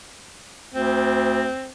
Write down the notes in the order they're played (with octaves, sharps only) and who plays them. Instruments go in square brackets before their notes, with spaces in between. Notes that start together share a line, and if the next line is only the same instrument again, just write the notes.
[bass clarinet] D2 [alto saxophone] C4